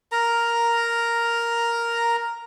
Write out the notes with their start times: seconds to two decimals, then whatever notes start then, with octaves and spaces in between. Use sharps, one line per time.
0.12 A#4 A#5